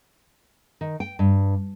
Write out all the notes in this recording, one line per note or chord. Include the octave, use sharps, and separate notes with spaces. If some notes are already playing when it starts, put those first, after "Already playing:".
D#3
G5
G2